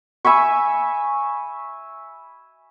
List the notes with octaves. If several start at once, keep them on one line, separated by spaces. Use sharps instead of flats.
E5 G#5 B5 C#6